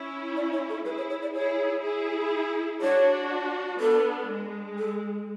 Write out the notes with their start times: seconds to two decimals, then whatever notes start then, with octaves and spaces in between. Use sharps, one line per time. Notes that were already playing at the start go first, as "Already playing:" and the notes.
Already playing: C#4 E4
0.36 D5
0.53 C#5
0.69 A4
0.85 E4 G#4 B4
0.97 C#5
1.10 C#5
1.22 D5
1.34 E4 G#4 C#5
1.84 E4 G#4
2.82 D4 F#4 C#5
3.80 B3 D4 A4
4.29 G#3
4.78 A4